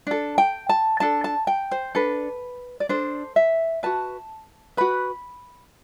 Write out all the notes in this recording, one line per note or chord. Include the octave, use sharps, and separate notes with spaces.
D4 A4
G5
A5
D4 A4 A5
A5
G5
C5
D4 A4 B4
D5
D4 A4 C5
E5
F#4 B4 A5
F#4 B4 B5